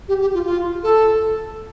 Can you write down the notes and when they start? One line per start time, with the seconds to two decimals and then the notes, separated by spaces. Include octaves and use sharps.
0.08 G4
0.21 G4
0.34 F4
0.46 F4
0.83 A4